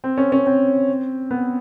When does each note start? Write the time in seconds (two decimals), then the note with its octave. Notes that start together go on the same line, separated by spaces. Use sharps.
0.04 C4
0.18 C#4
0.32 C#4
0.47 C4
1.31 B3